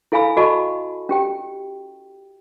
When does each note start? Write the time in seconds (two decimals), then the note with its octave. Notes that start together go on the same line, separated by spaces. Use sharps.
0.12 E4 A4 F5 G#5 B5 E6
0.37 F#4 A4 D#5 A5 B5 C#6
1.09 C#4 G4 G5